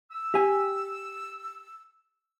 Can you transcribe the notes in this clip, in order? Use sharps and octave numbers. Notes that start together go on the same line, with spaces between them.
E6
G4 G#5